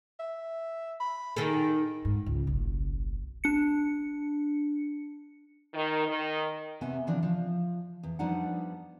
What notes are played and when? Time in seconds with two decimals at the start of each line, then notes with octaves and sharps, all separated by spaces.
0.19 E5
1.00 B5
1.36 D#3 G#4 A4
2.05 G#2
2.26 C#2
2.47 F#1 B1
3.44 D4 C#7
5.74 D#3
6.07 D#3
6.81 C3 B3 G4 E5 G#5
7.07 C#3 E3 F3 C4 D4
7.23 F3
8.03 E2
8.19 F3 G3 B3 D4 D#4 F#5